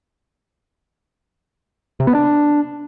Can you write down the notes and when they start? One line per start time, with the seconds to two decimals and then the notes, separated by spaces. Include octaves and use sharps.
2.00 C3
2.07 B3
2.15 D4